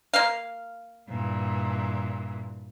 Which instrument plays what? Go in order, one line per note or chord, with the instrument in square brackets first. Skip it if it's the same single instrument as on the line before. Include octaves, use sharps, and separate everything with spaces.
[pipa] A#3 F5
[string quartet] G2 A#2 E3